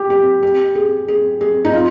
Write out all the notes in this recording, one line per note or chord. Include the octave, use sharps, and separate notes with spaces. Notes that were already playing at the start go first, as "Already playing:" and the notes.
Already playing: G4
G4
G4
G#4
G#4
G#4
D#4
F4